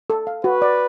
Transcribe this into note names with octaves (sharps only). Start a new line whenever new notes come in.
A4
F5
F#4 B4
D5